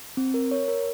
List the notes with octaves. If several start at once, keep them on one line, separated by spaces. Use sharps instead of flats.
C4
A#4
C#5
A#4